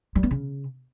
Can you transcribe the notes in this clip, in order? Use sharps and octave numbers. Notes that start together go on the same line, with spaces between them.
G3
B3
C#3